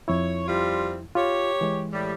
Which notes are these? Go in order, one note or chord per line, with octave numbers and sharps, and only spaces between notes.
F2 E4 C#5
G3 C4 F4
F4 G4 C#5
E3 G#3
A2 G3